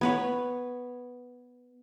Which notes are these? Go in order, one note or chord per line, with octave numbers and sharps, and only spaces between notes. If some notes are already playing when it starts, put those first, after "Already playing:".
B3 B4 C#5